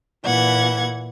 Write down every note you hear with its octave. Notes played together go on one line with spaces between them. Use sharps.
A#2 E3 F#5 G#6